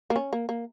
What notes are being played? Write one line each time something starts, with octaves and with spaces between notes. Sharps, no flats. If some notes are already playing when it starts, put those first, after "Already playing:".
A#3
C#4
A#3
A#3